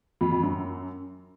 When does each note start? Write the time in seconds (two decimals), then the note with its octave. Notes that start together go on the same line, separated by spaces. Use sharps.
0.21 F2
0.32 F2
0.43 F#2